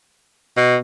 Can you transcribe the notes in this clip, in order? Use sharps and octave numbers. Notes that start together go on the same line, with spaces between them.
B2